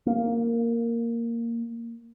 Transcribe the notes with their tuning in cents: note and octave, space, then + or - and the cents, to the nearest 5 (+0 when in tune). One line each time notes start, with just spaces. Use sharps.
A#3 -5